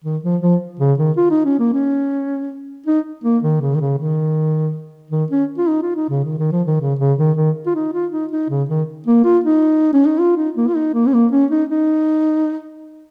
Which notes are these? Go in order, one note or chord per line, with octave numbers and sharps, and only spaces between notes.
D#3
F3
F3
C#3
D#3
F4
D#4
C#4
A#3
C#4
D#4
A#3
D#3
C#3
D#3
C#3
D#3
D#3
C#4
F4
D#4
F4
D#4
C#3
D#3
D#3
F3
D#3
C#3
C#3
D#3
D#3
F4
D#4
F4
D#4
D#4
C#3
D#3
A#3
F4
D#4
C#4
D#4
F4
D#4
A#3
F4
D#4
A#3
C#4
A#3
C#4
D#4
D#4